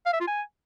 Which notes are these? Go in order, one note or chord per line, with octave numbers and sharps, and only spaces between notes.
F5
E5
F4
G#5